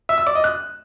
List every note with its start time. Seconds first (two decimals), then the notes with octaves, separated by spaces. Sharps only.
0.09 E5
0.18 E6
0.27 D5
0.35 D#5
0.44 F#6